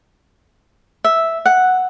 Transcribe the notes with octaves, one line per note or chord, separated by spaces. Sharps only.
E5
F#5